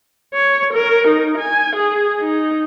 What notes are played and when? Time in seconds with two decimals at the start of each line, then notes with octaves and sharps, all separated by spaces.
0.34 C#5
0.73 A#4
1.07 D#4
1.38 G#5
1.76 G#4
2.20 D#4